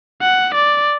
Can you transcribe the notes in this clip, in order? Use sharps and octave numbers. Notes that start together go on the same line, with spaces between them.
F#5
D5